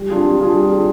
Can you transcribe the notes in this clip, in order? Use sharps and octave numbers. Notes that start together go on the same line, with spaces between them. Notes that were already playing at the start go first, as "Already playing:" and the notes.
Already playing: G3
D4 F4 G#4
G3
D4 F4 G#4
G3
D4 F4 G#4